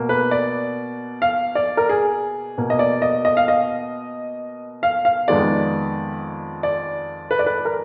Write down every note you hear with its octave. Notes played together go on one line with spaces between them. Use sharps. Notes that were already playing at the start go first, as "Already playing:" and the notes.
Already playing: B2 A#3
B4
D5
F5
D5
A#4
G#4
B2 A#3
D#5
D5
D#5
D#5
F5
D#5
F5
F5
F2 D#3 G#3 B3 D5
D5
B4
D5
B4
A#4